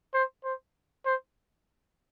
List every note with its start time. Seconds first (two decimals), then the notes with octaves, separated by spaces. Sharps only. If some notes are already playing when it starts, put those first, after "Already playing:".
0.14 C5
0.44 C5
1.06 C5